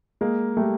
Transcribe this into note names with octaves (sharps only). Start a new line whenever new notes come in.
G#3 A#3
G3 A3